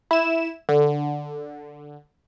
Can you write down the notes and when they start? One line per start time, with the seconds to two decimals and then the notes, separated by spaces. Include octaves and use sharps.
0.11 E4 E7
0.69 D3